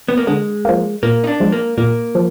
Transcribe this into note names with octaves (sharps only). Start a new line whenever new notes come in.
B3
A#3
D3 G#3
F3 A#3
A#2 A#3
D#4
D4
F3 G#3
A#3
A#2 A#3
F3